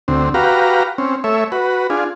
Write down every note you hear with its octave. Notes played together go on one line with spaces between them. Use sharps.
D2 C4
F#4 G4 B4 F5 A#5
C4 C#4
A3 C#5 E5
F#4 B4
D4 F4 G#4